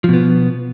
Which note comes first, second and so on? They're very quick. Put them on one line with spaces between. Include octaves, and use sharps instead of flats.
F3 B2 B3